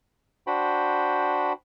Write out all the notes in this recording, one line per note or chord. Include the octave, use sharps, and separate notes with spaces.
D4 F#4 C5 G5 B5